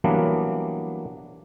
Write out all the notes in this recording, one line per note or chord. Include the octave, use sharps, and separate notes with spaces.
E3 F#3 G3 A#3 B3 D4